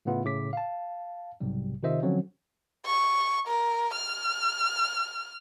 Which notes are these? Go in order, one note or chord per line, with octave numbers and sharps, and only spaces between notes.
A2 C#3 A3 B3 E4 F4
A2 C#3 D6 B6
F5 A5
B1 G#2 C3 G3
C3 D#3 F4 C5 D#5 E5
D3 F3 F#3 C4 C#4
C#6
A#4
F6